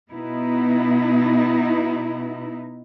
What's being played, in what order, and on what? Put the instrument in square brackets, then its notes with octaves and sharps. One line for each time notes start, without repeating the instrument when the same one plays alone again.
[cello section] B2 B3 D#4 E4